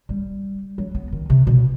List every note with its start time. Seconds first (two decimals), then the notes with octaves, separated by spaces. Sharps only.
0.09 G3
0.78 F#3
0.95 B3
1.12 D#3
1.30 C3
1.47 B2